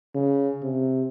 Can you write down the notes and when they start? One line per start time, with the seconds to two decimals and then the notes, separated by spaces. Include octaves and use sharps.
0.15 C#3
0.63 C3